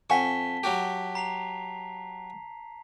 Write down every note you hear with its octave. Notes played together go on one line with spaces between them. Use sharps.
F2 F#5 G#5 A5 C#6 B6 G7
F#3 F#4 G4
A#5 C7 F7